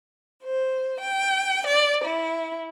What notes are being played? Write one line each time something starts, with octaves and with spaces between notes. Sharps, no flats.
C5
G5
D5
E4